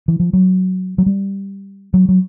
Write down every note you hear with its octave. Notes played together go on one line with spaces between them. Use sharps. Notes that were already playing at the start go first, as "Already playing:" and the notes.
E3
F3
F#3
F#3
G3
F#3
F#3